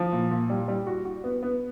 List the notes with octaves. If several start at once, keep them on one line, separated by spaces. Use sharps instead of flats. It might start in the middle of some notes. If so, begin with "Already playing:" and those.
Already playing: F3
A#2
A#2
G3
G3
F#4
F#4
B3
B3